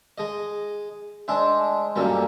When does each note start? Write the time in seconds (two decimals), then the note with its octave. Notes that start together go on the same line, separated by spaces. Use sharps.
0.18 G#3 D#5
1.28 G#3 D4 C5 E5
1.96 F#2 A#2 G3 A#3 G4 A4